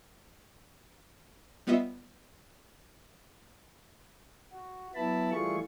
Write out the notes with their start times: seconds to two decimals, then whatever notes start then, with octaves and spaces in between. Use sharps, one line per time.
1.67 G3 B3 F4 D#5 E5
4.52 F#4
4.95 F#3 B3 E4 A5 B5
5.31 E3 G3 A3 F4 G#4 C#6